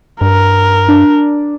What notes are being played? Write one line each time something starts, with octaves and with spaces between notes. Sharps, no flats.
G2 A#4
D4